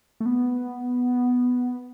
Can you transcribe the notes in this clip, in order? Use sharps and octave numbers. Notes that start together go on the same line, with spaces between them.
A3
B3